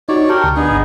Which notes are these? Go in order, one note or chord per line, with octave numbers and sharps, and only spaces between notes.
D#4 F#4 C#5 D5
G4 A#4 G5 A5 C#6
D2 C#6
B3 D4 D#4 G#4
G#1